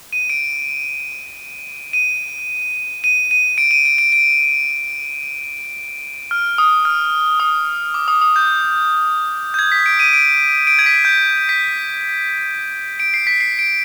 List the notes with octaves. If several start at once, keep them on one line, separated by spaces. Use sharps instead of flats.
D#7
D7
D#7
D#7
D#7
D7
D#7
D7
D7
D7
F6
D#6
F6
D#6
D6
D#6
D#6
G6
G6
G#6
B6
D7
D#7
D7
D7
G#6
B6
G6
B6
D7
C7
B6
C7
D7